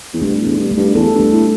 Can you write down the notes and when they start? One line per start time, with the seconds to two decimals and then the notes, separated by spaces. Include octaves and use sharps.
0.13 E2
0.22 G2 A3
0.41 E2
0.47 D4
0.59 G2
0.71 A3
0.77 G2
0.95 E2 A4
1.14 G2
1.19 A3
1.32 A2